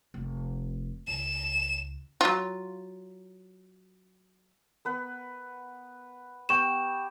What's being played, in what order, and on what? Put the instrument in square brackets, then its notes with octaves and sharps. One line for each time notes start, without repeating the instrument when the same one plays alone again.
[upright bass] F1
[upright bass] C#2 [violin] E7
[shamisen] F#3 F4
[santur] B3 B4
[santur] B3 G4 G5 [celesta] C#6 E7